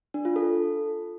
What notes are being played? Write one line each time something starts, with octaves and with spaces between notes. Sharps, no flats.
D4
F4
A4